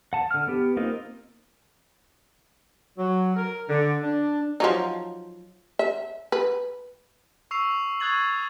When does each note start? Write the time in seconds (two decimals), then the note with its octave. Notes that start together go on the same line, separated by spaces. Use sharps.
0.13 F#5 A5
0.31 D3 F6
0.48 B3 G4
0.77 A#3 C4 D#4 F4
2.97 F#3
3.36 A#4
3.68 D3
4.02 D4
4.60 F3 F#3 D#4
5.79 E5
6.32 B4
7.51 C#6 E6 C7 F7
8.00 C#6 D#6 F#6 G#6 A6 F#7